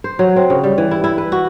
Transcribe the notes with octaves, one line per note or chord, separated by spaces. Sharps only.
C5
F#3
C4
C#3
G3
E3
E4
E4
B4
F#4